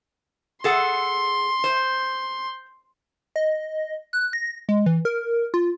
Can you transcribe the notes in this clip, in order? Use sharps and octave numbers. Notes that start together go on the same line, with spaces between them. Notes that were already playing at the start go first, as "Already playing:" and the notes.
G#4 A4 F#5 C6
C5
D#5
F#6
A#6
G#3
E3
A#4
F4